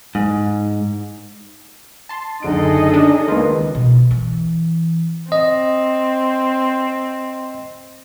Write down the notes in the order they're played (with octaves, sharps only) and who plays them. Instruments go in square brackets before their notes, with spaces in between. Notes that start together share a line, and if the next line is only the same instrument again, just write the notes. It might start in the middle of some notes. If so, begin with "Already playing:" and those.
[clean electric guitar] G#2
[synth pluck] A5 C6
[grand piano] F#1 D3 D7 [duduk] D#4 [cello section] G#4 A4 D#5
[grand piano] C#4 [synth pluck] D4
[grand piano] C#2 B4 C6 [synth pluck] D#3 A#3
[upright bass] B2
E3
[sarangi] C4 [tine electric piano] D#5